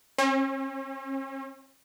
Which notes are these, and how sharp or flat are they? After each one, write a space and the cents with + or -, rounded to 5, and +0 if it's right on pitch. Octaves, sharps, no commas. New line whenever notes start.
C#4 -45